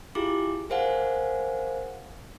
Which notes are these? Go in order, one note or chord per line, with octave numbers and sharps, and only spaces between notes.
E4 F4 G4 G#4 D6
G#4 A#4 C5 F5 F#5 G#5